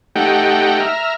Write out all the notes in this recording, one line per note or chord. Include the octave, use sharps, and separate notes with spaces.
A3 D#4 G4 F#5 G5
E5 A#5 F6